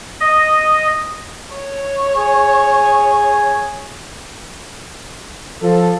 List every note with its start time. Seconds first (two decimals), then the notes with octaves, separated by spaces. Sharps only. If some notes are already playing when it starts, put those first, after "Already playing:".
0.21 D#5
1.55 C#5
2.15 G#4
5.63 F3 A4